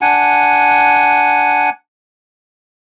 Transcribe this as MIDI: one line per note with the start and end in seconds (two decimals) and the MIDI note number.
0.01 1.70 62
0.01 1.70 78
0.01 1.70 80